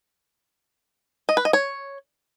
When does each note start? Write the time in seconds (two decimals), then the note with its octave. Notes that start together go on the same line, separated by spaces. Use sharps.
1.29 D#5
1.37 B4
1.45 D#5
1.53 C#5